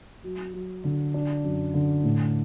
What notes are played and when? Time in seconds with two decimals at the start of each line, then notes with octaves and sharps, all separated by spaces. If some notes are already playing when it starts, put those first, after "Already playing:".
0.24 F#3
0.53 F#3
0.84 D3
1.14 D4
1.44 F#2
1.74 D3
2.04 A2